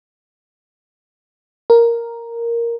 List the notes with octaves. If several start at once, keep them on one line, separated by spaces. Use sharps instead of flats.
A#4